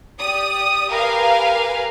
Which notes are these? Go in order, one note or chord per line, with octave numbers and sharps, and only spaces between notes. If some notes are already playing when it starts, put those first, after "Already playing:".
G4 D5 D#6
G4 A#4 B4 F5 G#5